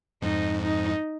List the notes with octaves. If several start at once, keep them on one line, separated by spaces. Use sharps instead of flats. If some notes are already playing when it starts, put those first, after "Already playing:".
F2 G#2 D#4
D#4